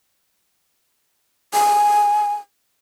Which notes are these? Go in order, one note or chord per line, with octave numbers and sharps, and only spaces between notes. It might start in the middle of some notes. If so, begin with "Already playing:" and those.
G#5